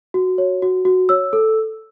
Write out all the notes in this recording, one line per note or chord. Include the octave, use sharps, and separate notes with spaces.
F#4
C#5
F#4
F#4
C#5 E6
A4